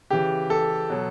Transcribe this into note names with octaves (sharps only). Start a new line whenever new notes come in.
C#3 E3 G4
A4
B2 F#3